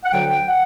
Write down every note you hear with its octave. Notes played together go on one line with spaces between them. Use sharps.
F#5
D2 D3 F#3 G5
G5
F#5